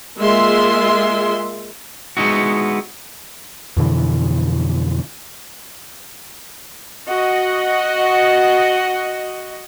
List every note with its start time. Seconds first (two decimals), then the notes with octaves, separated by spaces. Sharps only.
0.18 G#3 A#3 F4 E5 C6
2.17 G#3 B3 D#4 E4 F#4
3.77 F2 B2 D3 E3
7.09 F#4 D#5